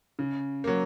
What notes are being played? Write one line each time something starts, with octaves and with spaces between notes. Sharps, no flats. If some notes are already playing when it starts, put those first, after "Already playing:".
C#3
F#3 A#3